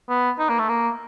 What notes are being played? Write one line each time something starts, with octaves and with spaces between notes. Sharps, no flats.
B3
D#4
A#3
A3
A#3